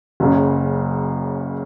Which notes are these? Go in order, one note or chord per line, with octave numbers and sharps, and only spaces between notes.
F#1 F#2 C#3